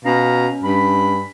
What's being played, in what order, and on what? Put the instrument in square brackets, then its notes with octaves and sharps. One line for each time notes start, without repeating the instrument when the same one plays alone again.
[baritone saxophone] B2 [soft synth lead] C#4 [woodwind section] F5 A#5
[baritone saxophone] G2 [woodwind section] B5